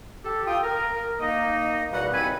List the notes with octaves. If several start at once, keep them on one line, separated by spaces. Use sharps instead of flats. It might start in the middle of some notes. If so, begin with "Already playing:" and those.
G4 A4
F4 G5 D#6
A#4
A#3 D#4 D#5
E2 B2 G3 F#5
D#2 C4 E4 B4 G#5 B5